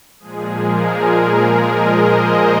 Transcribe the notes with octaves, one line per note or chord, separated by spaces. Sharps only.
A#2 F3 G#3 G#4
A#4
G#4
A#4
D#5
C5